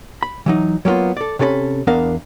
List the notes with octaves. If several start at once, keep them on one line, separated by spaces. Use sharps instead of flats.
B5
E3 F#3 D#4
F#3 G3 A#3 B3 F4
A4 D5
C3 C#4 A4 D5 B5
E2 B3 D4 A#4 F5